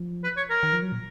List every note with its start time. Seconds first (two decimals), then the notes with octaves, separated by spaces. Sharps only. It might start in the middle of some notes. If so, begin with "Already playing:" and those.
Already playing: F3
0.24 B4
0.37 C#5
0.50 A#4
0.63 D#3
0.73 F3
0.82 F#3
0.92 A#2